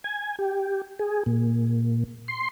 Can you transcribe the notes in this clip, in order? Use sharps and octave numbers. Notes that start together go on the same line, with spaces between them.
G#5
G4
G#4
A#2
C6